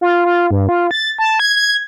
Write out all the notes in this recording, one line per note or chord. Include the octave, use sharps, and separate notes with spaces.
F4
F4
G2
F4
A6
A5
G#6
G#6